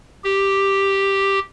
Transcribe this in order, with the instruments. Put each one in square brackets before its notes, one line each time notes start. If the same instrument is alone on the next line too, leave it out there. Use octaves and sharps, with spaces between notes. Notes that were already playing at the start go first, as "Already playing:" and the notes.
[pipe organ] G4